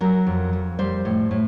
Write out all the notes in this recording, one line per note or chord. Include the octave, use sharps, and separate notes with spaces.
F#3 A#4
F2
F2
G3 C5
A2
A2